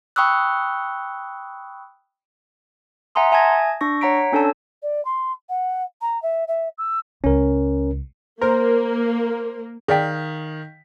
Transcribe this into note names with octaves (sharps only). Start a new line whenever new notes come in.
G5 B5 C#6 D#6 E6 F#6
E5 F#5 G#5 A#5 C6 D#6
E5 G#5 A5 D#6 G#6 A#6
D4 C#6 A#6
C#5 F#5 A#5 B6 D7
C#4 D4 A4 C#5 A5 E6
D5
C6
F#5
A#5
E5
E5
E6
C#2 C#4 A#4
A#3 A#4 C5
D#3 G#4 D5 F5 G5 B6